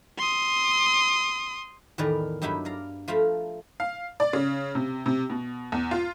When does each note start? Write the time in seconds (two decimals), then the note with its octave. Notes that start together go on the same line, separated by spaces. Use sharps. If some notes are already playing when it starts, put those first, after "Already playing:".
0.18 C6 D#6
1.98 E2 A2 D#3 B4 D5 A#5
2.42 G2 F#3 D#4 E4 G4 B5
2.65 D5 F5 A#5
3.08 F3 A3 F4 F5 A#5 B5
3.80 F5
4.20 D5
4.33 C#3
4.75 C3
5.06 C3
5.30 B2
5.72 E2
5.91 F4